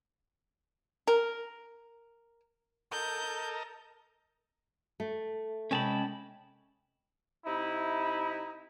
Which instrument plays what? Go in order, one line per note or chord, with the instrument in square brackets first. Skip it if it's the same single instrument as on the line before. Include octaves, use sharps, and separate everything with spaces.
[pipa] A#4
[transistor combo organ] A4 A#4 D#5 [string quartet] G6
[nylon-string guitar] A3
[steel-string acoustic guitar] C3 G#3 G5 [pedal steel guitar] C#4 A5 B5
[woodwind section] C3 D#4 E4